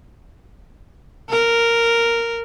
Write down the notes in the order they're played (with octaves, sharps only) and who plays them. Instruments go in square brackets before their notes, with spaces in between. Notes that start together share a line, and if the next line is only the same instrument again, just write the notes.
[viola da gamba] A#4